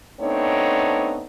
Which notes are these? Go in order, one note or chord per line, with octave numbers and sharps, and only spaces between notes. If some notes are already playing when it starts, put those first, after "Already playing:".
A3 B3 C4 D4 D#4 C#5